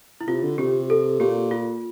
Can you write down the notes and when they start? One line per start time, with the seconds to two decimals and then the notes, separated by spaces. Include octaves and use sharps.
0.21 E4
0.27 C3 F4
0.43 D3
0.58 C3 G4
0.90 A4
1.20 A#2 G4
1.51 F4